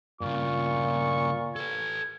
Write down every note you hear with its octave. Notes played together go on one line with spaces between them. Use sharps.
G2 A#2 C#3 F4 C#6
A4 B4 G#6